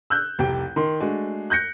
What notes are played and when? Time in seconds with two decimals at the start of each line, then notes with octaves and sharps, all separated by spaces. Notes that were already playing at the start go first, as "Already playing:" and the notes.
0.10 E6 F#6 G6
0.39 F1 C2 G4 G5
0.76 D#3 C6
1.00 G#3 A3 D4 F#4
1.50 F#6 G6 A#6 C#7